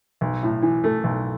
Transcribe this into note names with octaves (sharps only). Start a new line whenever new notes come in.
B1
A2
E3
A3
B1